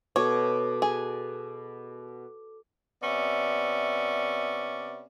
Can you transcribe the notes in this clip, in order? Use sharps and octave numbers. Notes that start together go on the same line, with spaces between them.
B2 A4 C#5 D6
G#4
C3 B3 C#4 D5 E5